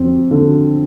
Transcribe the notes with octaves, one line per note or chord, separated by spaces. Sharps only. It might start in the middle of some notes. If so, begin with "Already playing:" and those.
Already playing: F2 C4
D3